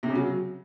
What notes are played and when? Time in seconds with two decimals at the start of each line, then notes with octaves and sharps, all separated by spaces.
0.03 C3
0.09 C#3
0.15 F#3